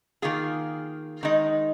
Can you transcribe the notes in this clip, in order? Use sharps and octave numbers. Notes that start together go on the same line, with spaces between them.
D#3 A#3 F4 G#4
D#3 G#3 D#4